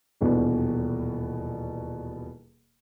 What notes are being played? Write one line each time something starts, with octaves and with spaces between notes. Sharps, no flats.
D#1 E2 B2 D4